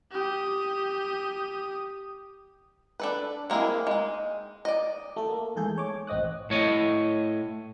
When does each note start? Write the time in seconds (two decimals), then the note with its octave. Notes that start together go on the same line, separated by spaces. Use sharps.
0.12 G4 D#6
3.00 D4 A4 B4
3.50 G#3 A#3 C4 E4 G#4
3.87 G#3 D#4
4.65 D5 D#5
5.16 A3 A4
5.29 A#3
5.56 E2 G#2 A3 G#4 A4 G6
5.78 C#5 D6
6.07 A1 C4 D#5 D#6 F#6
6.50 A2 C#5 D#5